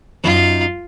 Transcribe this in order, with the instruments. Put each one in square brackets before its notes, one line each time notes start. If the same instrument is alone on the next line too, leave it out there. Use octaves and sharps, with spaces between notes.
[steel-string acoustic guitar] F#2 D#4 [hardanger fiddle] F4